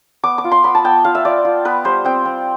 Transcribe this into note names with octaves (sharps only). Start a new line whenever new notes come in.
B3 D6
D6
F4
C6
B3 B5
A5
B3 G5
F4 F5
E5
F4 D5
F4
B3 B4
G3 C5
C4 G5
C4